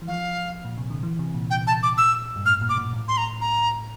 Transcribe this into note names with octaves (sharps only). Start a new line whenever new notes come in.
E3
F3 F5
A#2
C3
D3
E3
C3
A#2
G5
A5
D6
E6
G2
A2 F6
A#2
D6
A#2
A2
C6
A#5
A#5